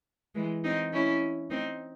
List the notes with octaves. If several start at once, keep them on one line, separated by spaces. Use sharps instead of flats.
E3 G#3
C4 D#4
C#4 E4
C4 D#4